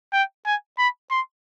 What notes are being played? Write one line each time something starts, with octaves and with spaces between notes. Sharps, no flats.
G5
G#5
B5
C6